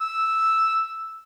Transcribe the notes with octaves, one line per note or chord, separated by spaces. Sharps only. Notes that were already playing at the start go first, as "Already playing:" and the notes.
E6